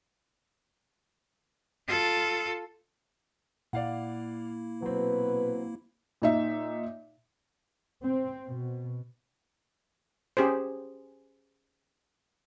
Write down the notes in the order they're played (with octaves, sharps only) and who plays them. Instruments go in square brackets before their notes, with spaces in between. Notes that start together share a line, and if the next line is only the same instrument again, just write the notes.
[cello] F4 A4
[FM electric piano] A#2 [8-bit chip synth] A#3 E4 [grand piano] D5 F5 F#5
[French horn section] B2 B4 [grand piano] F#3 C4
[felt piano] A#2 D#4 E5
[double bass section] C4
B2
[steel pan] C#4 G4 G#4 C5